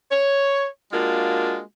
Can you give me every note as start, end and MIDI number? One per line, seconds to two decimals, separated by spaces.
0.11 0.67 73
0.92 1.60 56
0.92 1.60 58
0.92 1.60 62
0.92 1.60 65
0.92 1.60 66